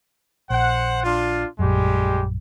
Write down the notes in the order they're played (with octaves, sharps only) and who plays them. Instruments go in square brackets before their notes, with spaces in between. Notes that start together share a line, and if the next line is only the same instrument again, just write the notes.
[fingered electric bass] A#1 [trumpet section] C5 F#5
[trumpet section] D4 F4
[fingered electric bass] A#1 F#2 [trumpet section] G3 G#3 G4